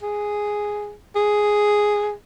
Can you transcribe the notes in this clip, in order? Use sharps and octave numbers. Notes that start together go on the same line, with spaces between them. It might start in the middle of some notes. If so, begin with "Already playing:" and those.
G#4
G#4